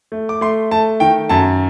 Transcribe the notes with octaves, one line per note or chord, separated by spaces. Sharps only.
A3
D6
A3 C6
A3 A5
D#3 G5
F#2 A5